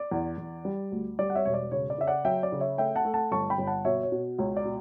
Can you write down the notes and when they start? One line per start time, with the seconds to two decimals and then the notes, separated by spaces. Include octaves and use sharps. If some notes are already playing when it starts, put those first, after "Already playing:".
Already playing: D5
0.11 E2
0.38 E2
0.65 G3
0.92 D2
1.19 G3 D5
1.30 F#5
1.35 C#5 E5
1.45 E1 C#5
1.54 D5
1.71 C#3 C#5
1.90 D5
1.98 C#3 E5
2.07 D5 F#5
2.25 F#3 E5 G5
2.43 D5
2.52 C#3
2.60 C#5 E5
2.78 A3 E5 G5
2.96 F#5 A5
3.05 A3
3.14 F#5 A5
3.32 G1 A5 C#6
3.50 G5 B5
3.58 G1
3.67 F#5 A5
3.85 B2 C#5 E5
4.03 C#5
4.12 B2
4.38 C#2 C#5
4.57 D5
4.65 B2